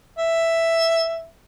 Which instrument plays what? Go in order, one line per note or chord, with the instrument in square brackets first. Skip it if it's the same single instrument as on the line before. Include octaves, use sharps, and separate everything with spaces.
[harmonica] E5